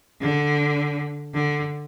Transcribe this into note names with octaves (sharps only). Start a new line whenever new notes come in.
D3
D3